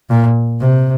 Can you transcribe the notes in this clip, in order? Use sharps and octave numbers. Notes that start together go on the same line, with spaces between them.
A#2
C3